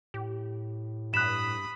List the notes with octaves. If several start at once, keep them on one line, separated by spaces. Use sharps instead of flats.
A2 G4
G2 B5 D#6 F#6 E7